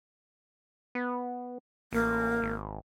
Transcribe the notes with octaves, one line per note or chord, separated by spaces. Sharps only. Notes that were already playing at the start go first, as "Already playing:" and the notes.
B3
A1 A#3
G#1